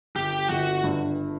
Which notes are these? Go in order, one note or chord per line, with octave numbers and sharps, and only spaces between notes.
G1 G4
G1 F#4
G2